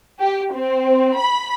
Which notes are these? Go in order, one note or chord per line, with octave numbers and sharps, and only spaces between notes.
G4
C4
B5